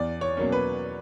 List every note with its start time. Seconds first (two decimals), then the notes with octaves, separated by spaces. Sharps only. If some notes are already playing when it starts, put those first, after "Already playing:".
Already playing: E2 D5
0.21 C#5
0.37 B2 F#3 A#3 C#4
0.52 B4